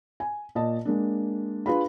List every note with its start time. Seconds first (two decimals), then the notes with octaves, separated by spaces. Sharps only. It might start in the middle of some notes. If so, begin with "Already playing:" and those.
0.20 G#5
0.55 A#2 D#5 A5
0.85 G#3 A#3 D4
1.66 D4 F4 G#4 B4 F5 B5